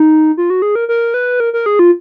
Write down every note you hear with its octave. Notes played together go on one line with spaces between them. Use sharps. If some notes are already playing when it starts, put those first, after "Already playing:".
Already playing: D#4
F4
F#4
G#4
A#4
A#4
B4
A#4
A#4
G#4
F4